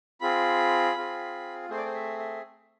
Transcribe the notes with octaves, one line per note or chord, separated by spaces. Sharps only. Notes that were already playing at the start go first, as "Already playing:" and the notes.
C4 F4 G#4 B5
C4 F4 G#4
A3 C4 G#4 C5
D5
C5
E5
E5